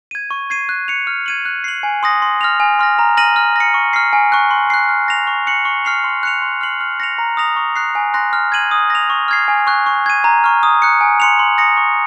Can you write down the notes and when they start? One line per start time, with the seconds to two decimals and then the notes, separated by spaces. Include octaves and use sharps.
0.11 G#6 D#7
0.31 C#6
0.50 G#6 C7 D#7
0.69 F#6
0.88 C#7 F7
1.07 F6
1.26 G#6 D#7 F#7
1.45 F#6
1.64 C7 F#7
1.83 G#5
2.03 C6 D#6 A#6
2.22 C6
2.41 F6 A#6 F7
2.60 G#5
2.79 C6 F6 A#6
2.99 A#5
3.17 F6 A#6 D#7 F#7
3.36 F6
3.56 A#6 C#7
3.74 C#6
3.93 F6 C7
4.13 G#5
4.32 C#6 F#6
4.51 C6
4.70 F#6 C7
4.89 F6
5.08 A#6 F7
5.27 C#6
5.47 F#6 C#7 F#7
5.65 C#6
5.85 F6 C7 F7
6.04 C6
6.23 F#6 C#7 F7
6.42 C6
6.61 F6 C7 F#7
6.81 F6
7.00 A#6 C#7 F7
7.18 A#5
7.37 D#6 A#6 F7
7.56 C#6
7.76 F#6 C7
7.95 G#5
8.14 C6 F#6 A#6
8.33 F6
8.52 G#6 D#7 F#7
8.71 D#6
8.90 A#6 F7
9.10 C#6
9.28 F6 G#6 C7
9.48 G#5
9.67 C#6 F#6
9.86 C#6
10.06 G#6 D#7
10.24 A#5
10.44 C#6 F6
10.63 D#6
10.82 F#6 C#7
11.01 G#5
11.20 C6 F#6 C#7 F7
11.39 C6
11.58 D#6 A#6 C#7
11.77 C#6